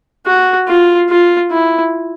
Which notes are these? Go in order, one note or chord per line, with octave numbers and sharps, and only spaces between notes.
F#4
F4
F4
E4